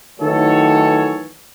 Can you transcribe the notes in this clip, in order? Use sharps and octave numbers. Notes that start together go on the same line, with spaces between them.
D#3 E3 F#3 A3 A4 C#5